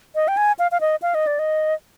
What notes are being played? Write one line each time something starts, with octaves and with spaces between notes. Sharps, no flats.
D#5
G5
G#5
F5
F5
D#5
F5
D#5
D5
D#5